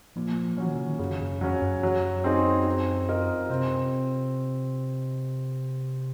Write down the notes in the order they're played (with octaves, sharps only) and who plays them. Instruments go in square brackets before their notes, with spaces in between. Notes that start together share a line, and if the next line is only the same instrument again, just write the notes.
[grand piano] A#2 [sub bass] F3
[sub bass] F3 [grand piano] F#3 C#4
[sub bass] D#3
C#3
D#3
[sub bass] F#2 [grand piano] C#3
[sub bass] F#2
[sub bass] F2 [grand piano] F#3 C#4
[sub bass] F#2
[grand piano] F#3
C4 D#4 G#4
C4
F4 A#4 D#5
[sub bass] C3 [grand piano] C4